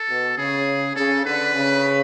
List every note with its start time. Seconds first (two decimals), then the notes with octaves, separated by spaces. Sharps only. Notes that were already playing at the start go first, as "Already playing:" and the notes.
Already playing: A4
0.09 B2
0.37 C#3 G#4
0.96 C#3 A4
1.25 D3 B4
1.54 C#3